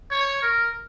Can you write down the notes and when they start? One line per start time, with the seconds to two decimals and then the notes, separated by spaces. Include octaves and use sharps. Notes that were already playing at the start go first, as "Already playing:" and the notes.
0.11 C#5
0.42 A#4